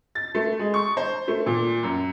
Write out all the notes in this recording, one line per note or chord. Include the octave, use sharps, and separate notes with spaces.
A6
A3
G#3
C#6
C5
A3
A#2
F#2